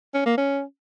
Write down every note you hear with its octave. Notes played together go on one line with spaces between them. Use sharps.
C#4
A#3
C#4